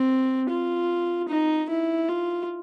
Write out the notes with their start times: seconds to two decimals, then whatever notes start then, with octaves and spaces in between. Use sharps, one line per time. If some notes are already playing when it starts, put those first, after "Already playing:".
Already playing: C4
0.50 F4
1.29 D#4
1.70 E4
2.09 F4